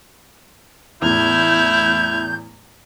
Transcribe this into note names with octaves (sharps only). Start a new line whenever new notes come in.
E2 A2 E4 F6 G6 G#6